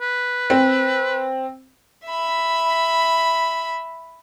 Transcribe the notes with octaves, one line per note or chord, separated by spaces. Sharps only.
B4
C4
E5 B5